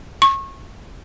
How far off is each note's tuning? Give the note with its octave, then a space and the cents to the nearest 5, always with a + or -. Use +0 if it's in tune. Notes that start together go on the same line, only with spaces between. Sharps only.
C#6 -30